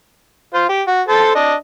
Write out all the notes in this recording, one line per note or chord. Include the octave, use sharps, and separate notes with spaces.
F4 C5
G4
F#4
A4 C5 A5
D4 D#5